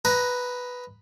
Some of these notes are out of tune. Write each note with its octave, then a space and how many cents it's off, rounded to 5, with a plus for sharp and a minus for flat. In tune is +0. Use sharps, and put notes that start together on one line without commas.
B4 +0 D#5 +10 A#5 +0